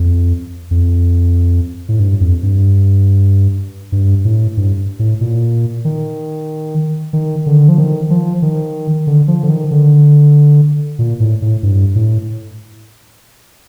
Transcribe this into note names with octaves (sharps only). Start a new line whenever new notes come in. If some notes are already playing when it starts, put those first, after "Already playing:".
Already playing: F2
F2
A2
G2
F2
G2
G2
A2
G2
A2
A#2
D#3
D#3
D3
F3
D#3
F3
D#3
D3
F3
D3
D#3
D3
A#2
A2
A2
G2
A2